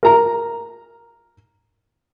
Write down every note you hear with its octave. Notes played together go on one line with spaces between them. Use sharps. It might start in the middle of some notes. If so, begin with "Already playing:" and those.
A#4 A#5